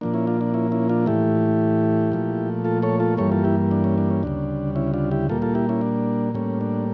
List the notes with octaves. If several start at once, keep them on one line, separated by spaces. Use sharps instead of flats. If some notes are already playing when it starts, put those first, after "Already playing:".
A#2 F3 A#3 D4
C#4 E4
D4 F4
D4
C#4 E4
C#4 E4
D4 F4
A2 E3 A3 E4 G4
A#2 F3 A3
F4 A4
A4 C#5
F4 A4
G2 E3 G3 A#3 A4 C#5
F4 A4
E4 G4
D4
C#4
D4
C#4
D2 C#3 G3 D4
C#4 E4
D4 F4
E4 G4
A#2 G3 A#3 F4 A4
F4 A4
E4 G4
C#4 E4
D4
A2 G3 A#3 C#4
D4